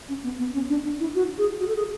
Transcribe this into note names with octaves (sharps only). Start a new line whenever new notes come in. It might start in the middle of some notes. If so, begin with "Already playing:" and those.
C#4
B3
B3
C#4
D4
D4
E4
F#4
G#4
F#4
A4
G#4